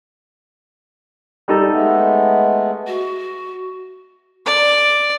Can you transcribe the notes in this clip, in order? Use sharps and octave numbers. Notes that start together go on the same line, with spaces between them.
G3 D#4 A4
G#3 A3 B3
F#4
D5